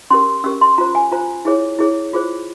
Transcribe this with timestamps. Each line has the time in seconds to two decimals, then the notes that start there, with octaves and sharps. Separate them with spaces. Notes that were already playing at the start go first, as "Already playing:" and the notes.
0.10 C#4 G4 A#4 C6
0.44 C#4 G4 A#4 E6
0.61 C6
0.78 F4 C5 A#5
0.95 G#5
1.12 F4 C5 A#5
1.45 E4 G#4 C#5
1.79 E4 G#4 C#5
2.13 F4 G#4 C5